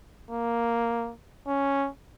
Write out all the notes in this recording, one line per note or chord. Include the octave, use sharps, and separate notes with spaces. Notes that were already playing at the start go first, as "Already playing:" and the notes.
A#3
C#4